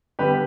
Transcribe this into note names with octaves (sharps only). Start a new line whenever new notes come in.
D3 G3 B3 G4 B4